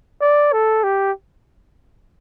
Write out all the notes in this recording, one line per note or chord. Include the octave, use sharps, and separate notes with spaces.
D5
A4
G4